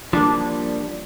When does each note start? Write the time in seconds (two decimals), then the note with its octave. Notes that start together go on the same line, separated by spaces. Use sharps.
0.13 F3 G3 A#3 D4